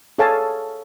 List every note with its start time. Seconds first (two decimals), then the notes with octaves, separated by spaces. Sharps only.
0.18 G#4 A4 C#5 F5 G#5 A5